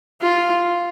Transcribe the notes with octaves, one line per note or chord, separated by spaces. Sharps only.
F4